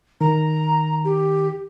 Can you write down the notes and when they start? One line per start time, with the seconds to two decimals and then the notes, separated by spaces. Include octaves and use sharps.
0.21 D#3 A#5
1.05 G4